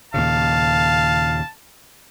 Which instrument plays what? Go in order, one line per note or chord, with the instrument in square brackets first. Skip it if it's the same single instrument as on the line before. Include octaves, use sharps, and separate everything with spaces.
[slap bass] D#2 A#2 C#3 [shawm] F5 [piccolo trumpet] A5